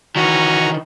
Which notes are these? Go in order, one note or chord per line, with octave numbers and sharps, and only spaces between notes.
D#3 E3 C#4 F#4 A#5